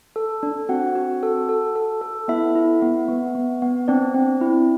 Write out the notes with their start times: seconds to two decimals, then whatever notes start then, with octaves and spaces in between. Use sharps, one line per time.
0.16 A4
0.43 D4
0.69 C4 F#4 F#5
0.95 F#4
1.23 A4
1.49 A4
1.76 A4
2.02 A4
2.28 B3 E4 E5
2.55 E4
2.82 B3
3.08 B3
3.35 B3
3.62 B3
3.88 C4 D4 D5
4.14 C4
4.41 E4